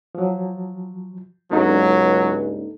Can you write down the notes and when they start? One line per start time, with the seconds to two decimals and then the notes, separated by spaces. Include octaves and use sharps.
0.15 F3 F#3
1.51 C#2 G2 F#3 A#3 D#4 A4